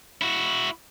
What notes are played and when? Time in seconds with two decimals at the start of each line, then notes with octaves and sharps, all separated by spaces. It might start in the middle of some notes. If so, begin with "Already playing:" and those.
0.22 E4 F#4